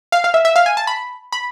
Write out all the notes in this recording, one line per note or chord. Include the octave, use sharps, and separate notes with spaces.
F5
F5
E5
E5
F5
G#5
A5
B5
B5